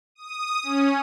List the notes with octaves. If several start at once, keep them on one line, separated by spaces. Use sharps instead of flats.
D#6
C#4